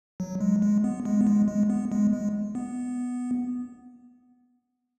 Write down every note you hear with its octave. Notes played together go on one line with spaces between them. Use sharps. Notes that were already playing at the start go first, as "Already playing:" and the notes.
F#3
G#3
G#3
B3
G#3
B3
G#3
G#3
B3
G#3
G#3
B3